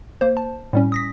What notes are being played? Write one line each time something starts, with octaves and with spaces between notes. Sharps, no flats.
A#3 C5
A5
A2 G3 C#4
D#6 A#6 B6